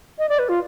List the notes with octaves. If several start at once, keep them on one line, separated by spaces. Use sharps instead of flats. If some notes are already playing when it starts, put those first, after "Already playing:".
D#5
D5
B4
F4